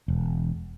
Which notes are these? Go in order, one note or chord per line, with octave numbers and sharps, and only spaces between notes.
E1